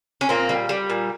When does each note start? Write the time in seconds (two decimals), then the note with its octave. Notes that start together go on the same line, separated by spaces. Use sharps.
0.21 C#4
0.29 A#2 A#3 C4
0.49 G3
0.69 G3
0.90 A#2